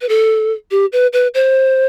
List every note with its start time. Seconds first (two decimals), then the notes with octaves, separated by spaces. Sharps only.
0.01 B4
0.09 A4
0.71 G4
0.93 B4
1.13 B4
1.34 C5